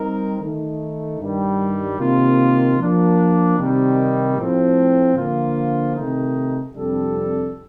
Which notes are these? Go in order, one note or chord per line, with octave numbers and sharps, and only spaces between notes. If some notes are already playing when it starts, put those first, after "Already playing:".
Already playing: G3 C4 D#4 A#4
D#3 A3 D#4
G2 D#3 G3
C3 D#3 A#3 F4
F3 A#3 D4
C3 D#3 G3
A2 F3 C4
D3 F3 A#3 F4
C3 D#3 A3 D#4
F2 C3 G3 D4 A4